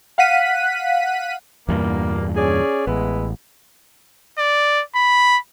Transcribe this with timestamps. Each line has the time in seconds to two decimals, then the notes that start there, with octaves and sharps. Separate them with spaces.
0.18 F5 F#5 F#6 B6 D#7
1.68 E2 G2 A#2 G3 A#3
2.36 C#4 G#4 D5
2.87 A1 G#3 B3 E4
4.38 D5
4.95 B5